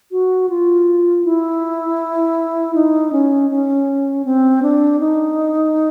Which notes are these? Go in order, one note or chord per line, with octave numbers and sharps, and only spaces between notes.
F#4
F4
E4
D#4
C#4
C#4
C4
D4
D#4